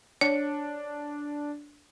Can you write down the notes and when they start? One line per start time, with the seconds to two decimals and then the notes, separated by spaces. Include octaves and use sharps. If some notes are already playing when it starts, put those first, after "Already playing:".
0.21 D4 C#5